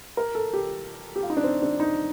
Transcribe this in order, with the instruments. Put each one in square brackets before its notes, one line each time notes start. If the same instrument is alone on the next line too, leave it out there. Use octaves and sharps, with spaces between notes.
[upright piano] A#4
A4
G4
G4
F4
D#4
D4
C4
D4
D#4